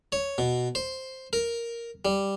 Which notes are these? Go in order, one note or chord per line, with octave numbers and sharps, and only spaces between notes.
C#5
B2
C5
A#4
G3